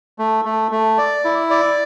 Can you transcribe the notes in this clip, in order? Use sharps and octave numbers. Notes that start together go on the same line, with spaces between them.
A3
A3
A3
D5
E4
D5